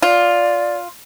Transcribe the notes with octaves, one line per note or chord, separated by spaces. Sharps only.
F4 D5